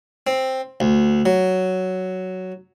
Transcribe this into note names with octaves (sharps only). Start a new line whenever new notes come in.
C4
D2
F#3